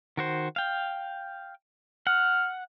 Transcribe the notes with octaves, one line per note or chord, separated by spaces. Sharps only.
D#3 F#4 C5
F5 G5
F#5 F6